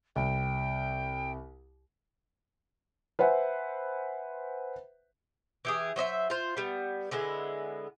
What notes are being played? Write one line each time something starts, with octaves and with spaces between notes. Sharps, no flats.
C2 G5
B4 C5 E5 F#5 G#5
E3 G4 G#4
F#3 C5 D#5 E5
F4 C5
G3 B3
D3 G#3 B3 E4